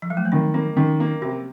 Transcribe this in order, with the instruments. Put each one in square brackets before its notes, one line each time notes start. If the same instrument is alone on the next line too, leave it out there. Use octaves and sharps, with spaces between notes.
[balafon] F3
F#3
A3
A#3
[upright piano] D#3 [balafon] C4
[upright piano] A#3 [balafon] C4
[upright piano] D#3 [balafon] C#4
[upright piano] A#3
[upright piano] C3 [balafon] C4